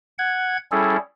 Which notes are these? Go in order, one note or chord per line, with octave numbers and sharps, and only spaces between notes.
F#5 G#6
G3 C#4 E4 G#4 A4